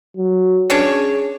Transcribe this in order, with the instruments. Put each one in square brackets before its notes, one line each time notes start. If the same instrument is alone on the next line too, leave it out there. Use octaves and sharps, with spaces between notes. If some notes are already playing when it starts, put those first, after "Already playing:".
[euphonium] F#3
[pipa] C#4 D4 C#5 [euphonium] G#4